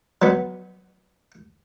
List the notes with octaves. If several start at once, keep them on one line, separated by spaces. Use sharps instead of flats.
F#3 B3